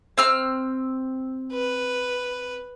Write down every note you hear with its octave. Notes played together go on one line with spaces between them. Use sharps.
C4 E6 F6
B4